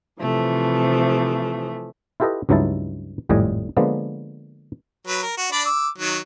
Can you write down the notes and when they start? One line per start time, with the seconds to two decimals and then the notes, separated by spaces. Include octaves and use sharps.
0.20 C3 E3 F3 A3
2.20 E4 F4 G4 A4 B4 D#5
2.49 C#2 G2 F#3 D#4 E4 A5
3.29 G#1 F2 A2 G3 D#5 G#5
3.77 D3 F3 G#3 A#3 B3
5.07 F#3 B4
5.22 A#4
5.37 F#4
5.52 D4 D5 B5
5.65 D6 E6
5.98 D#3 F#3